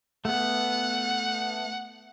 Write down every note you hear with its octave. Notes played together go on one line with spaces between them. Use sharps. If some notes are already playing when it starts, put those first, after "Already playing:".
A3 B3 F#5